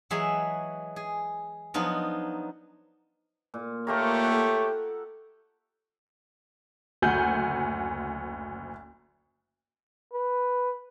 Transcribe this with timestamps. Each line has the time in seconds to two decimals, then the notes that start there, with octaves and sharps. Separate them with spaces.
0.10 E3 F#3 G#3 G#4 E5
0.96 G#4
1.74 F3 F#3 B3 D4 D#4 F4
3.54 A#2
3.87 A3 A#3 F4 G4 C#5 A#5
4.24 A4 F#5
7.02 F#1 D2 F#5 G#5 G6
10.13 B4